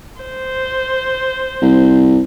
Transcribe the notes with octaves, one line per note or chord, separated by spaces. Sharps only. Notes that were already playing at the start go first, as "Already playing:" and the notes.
C5
C2